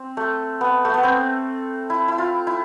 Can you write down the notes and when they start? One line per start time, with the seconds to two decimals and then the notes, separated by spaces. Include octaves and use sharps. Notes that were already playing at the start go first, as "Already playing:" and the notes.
Already playing: C4
0.17 A3
0.61 B3
0.85 A3
0.94 B3
1.03 C4
1.90 E4
2.08 E4
2.18 F4
2.47 E4